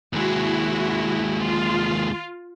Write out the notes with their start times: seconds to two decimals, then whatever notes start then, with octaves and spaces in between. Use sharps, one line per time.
0.13 D#2 G#3 E4 F#4
1.43 F4